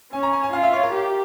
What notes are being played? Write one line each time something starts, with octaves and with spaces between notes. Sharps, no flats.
C#4 G#5
A#5
G#5
G#5
F4 F5
E5
C#5
A#4
G4